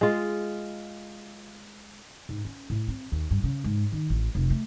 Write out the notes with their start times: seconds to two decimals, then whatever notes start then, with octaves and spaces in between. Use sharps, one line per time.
0.01 G#3 F4
2.29 G#2
2.45 C#4
2.70 A2
2.88 C4
3.12 D#2
3.31 G2
3.44 C#3
3.64 G#2
3.92 D#3
4.10 A1
4.35 F1
4.50 A3